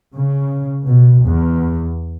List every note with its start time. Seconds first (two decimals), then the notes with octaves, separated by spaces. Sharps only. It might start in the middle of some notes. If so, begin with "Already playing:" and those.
0.14 C#3
0.89 B2
1.26 E2